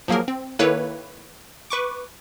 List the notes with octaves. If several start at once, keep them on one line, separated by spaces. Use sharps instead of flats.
F3 F#3 A#3 G#4 A#4
C4
D#3 A#3 E4 A4 B4 C#5
B4 C#6 D6